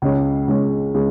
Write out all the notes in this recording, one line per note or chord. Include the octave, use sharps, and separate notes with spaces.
C#2 C#3 G#3 C#4
C#2 C#3 G#3 C#4
C#3 G#3